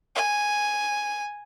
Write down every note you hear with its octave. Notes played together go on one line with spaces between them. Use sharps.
G#5